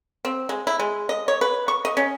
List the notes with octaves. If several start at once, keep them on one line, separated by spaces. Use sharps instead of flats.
C4
G#3
E4
G#3
D#5
C#5
B4
C#6
D#5
C#4